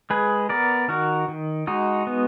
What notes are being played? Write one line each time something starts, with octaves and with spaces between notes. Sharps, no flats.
G#3 G#4 B4
B3 A#4 D5
D#3 F#4 A#4
D#3
G#3 D#4 F#4
B3